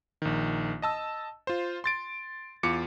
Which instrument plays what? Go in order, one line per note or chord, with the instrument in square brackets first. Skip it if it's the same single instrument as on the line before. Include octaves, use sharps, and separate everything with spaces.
[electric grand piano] A#1 D#3
D#5 A5 E6
F4 C5
C6 A6 D7
E2 F4 D6 C#7